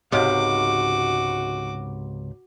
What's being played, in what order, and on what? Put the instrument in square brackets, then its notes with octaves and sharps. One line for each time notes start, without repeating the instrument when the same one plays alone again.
[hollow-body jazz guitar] C#2 G#2 C3 [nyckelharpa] F#4 D6